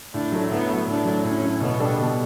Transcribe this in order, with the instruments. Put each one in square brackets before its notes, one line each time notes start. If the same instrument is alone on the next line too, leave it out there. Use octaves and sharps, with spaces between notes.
[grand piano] A2 [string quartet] D4
[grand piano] F#3 A3
[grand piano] A2 [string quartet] B3
[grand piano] F#3 A3
[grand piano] A2 [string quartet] D4
[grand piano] F#3 A3
[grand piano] A2 [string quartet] C#4
[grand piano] F#3 A3
[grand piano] B2 [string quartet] B3
[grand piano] G3 D4 A4
B2